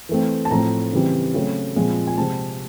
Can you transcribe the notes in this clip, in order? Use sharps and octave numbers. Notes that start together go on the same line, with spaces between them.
E3 A3 C4
A5
A2 F3 A3 C4 A#5
C#3 E3 G3 C4
C#3 F#3 A3 C4
A#2 F3 G#3 C4
G#5
C3 F3 G#3 C4 A5